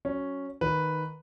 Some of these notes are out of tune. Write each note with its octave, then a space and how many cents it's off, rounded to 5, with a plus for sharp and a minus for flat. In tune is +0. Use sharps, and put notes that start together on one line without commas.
F#3 +0 C#4 +0
D#3 +0 B4 +0